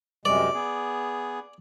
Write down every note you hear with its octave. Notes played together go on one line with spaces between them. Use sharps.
F#2 C3 G#3 D5
B3 G#4